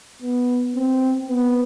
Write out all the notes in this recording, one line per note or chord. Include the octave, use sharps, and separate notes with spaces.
B3
C4
B3